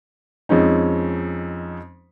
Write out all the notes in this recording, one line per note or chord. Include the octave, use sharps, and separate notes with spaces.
F2 G#3 C#4 D#4